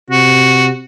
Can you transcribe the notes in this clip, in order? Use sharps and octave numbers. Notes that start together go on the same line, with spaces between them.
C3 F#4